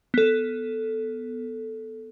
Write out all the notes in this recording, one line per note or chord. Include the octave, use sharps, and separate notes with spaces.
B3 A4